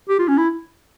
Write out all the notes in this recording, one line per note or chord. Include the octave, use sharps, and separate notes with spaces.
G4
F4
C#4
E4